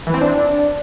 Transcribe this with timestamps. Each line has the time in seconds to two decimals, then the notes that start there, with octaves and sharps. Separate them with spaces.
0.07 E3
0.14 C4
0.21 D4